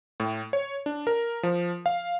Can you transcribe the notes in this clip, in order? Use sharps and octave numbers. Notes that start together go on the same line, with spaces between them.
A2
C#5
D4
A#4
F3
F5